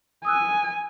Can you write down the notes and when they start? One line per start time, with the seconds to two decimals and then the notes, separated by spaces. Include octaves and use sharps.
0.25 G#5 D#6 E6 F#6